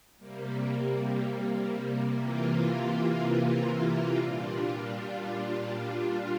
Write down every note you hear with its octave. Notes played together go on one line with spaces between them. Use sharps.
C3 G3 A#3
C3 E3 A#3 F4
A#2 G3 D4 F4